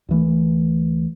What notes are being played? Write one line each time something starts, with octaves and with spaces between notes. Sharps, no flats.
D2 E3 A3